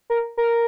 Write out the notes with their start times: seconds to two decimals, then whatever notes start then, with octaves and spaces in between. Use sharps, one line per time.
0.10 A#4
0.37 A#4